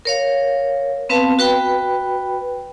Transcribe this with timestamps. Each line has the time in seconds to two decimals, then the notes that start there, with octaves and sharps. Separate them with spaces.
0.05 A#4 C#5 F5
1.09 B3 C4 B4 F5 A5
1.39 F#4 B4 G5 B5